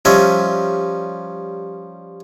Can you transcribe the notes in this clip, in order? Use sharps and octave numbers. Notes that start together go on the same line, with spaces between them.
F3 G3 C#4 D#5 E5